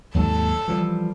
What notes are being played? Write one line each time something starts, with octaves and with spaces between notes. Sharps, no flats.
D#2 G#2 F#3 A4
E3 F3 G3